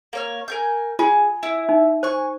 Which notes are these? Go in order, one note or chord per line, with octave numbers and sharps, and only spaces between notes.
A#3 C#5 F6
A#4 G#5 G6
F4 G#4 G#5
E4
D#4
C5 G#5 C#6